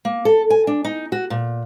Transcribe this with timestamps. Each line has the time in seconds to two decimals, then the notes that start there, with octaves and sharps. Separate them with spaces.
0.05 A#3
0.25 A4
0.50 G#5
0.67 D4
0.84 D#4
1.12 F#4
1.30 A#2